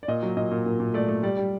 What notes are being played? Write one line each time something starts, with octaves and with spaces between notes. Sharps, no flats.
D5
A#2 D#5
F#3
A#2 D#5
A#2
A#2
A#2
A3 D5
A3
G3 D5
G3